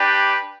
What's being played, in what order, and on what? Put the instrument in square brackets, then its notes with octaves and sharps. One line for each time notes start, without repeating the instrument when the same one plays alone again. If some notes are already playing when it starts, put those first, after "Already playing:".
Already playing: [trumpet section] D4 G4 B4 D5 G5